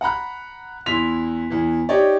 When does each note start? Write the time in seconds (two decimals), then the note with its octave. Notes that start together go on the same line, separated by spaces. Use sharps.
0.01 F#5 A#5 B5 F#6
0.86 E2 E4 C6 B6 F7
1.50 E2 E3
1.89 D#4 G4 C#5 D5